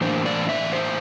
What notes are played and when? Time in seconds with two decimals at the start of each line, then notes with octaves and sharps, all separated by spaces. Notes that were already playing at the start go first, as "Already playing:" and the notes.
0.01 A2 E3 A#3 D4 C5
0.26 D5
0.49 E5
0.73 C5